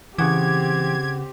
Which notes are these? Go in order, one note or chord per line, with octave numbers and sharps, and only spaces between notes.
C#3 E3 C4 G4 F#5 D6 G#6